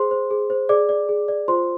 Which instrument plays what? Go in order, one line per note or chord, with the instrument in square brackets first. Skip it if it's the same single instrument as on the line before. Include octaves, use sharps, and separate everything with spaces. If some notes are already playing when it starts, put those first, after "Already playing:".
Already playing: [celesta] G#4 C5 C6
C5
G#4
C5
G#4 D5 D6
D5
G#4
D5
F4 C5 C6